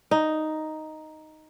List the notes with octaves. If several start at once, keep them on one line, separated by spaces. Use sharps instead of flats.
D#4